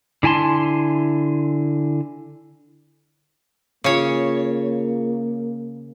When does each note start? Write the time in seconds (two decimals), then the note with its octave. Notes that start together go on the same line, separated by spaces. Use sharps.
0.23 D3 E4 G#5 A5 C6
3.84 C#3 A#3 F4 G#4 C#5